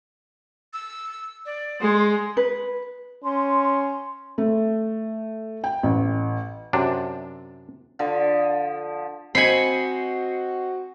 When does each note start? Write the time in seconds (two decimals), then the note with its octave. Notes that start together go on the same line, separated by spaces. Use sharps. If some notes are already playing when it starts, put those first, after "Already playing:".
0.73 E6
1.46 D5
1.81 G#3 C6
2.37 B4
3.24 C#4 C6
4.38 A3
5.64 G5
5.83 A1
6.73 F#2 C3 D4
7.99 D3 F3
9.35 C4 F#4 C5 D#5 G#5 B5 C7 C#7